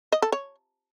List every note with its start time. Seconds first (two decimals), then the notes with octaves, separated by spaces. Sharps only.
0.12 D#5
0.22 A4
0.32 C#5